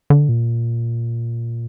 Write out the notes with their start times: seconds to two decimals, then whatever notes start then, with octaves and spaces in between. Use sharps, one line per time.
0.10 D3
0.29 A#2